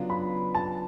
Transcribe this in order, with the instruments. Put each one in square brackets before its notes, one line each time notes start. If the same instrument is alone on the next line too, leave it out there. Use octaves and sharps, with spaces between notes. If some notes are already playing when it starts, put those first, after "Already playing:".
Already playing: [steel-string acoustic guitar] C#3 F#3 B3 D4 F4
[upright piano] B5
A5